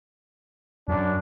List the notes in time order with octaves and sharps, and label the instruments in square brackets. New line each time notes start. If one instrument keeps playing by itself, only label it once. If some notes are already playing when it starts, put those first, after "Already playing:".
[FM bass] F#2 [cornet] D4